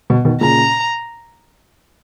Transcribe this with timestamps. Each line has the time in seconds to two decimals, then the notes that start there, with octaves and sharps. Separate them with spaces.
0.10 B2
0.25 B2 D#3
0.41 A#2 C#3 A#5